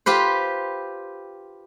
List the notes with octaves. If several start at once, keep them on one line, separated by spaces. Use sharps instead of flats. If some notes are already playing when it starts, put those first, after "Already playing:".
F4 G4 B4 C5